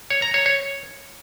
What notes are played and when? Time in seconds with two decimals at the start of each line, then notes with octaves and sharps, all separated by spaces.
0.10 C#5
0.22 A#5
0.34 C#5
0.46 C#5